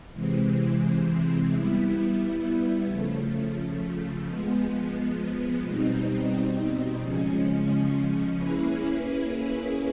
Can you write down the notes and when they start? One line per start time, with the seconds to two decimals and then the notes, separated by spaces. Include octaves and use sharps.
0.14 C3 E3 G#3 C4
1.50 G3 B3 E4
2.88 C#3 F3 A3
4.25 F3 G#3 B3
5.62 B2 G3 C4 D#4
6.99 C#3 F3 G#3 C#4
8.36 A#3 C#4 E4 G#4 B4